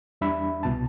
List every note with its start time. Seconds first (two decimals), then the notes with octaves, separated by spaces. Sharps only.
0.21 E2 G3 D4 E5 B5
0.63 C2 B2 A5